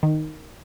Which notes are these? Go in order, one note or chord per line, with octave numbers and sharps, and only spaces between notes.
D#3